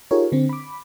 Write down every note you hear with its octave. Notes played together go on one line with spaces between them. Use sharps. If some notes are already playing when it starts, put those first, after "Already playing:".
D#4 F4 G4 G#4 A#4 C#5
D3 C4
B5 D6